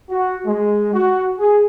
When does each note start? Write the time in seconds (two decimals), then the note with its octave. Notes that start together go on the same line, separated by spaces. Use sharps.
0.10 F#4
0.44 G#3
0.93 F#4
1.37 G#4